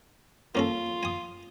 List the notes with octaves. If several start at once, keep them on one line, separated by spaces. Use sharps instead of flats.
A#3 C#4 F4 A4
G#5 D#6